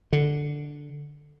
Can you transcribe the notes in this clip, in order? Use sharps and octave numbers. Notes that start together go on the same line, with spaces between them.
D3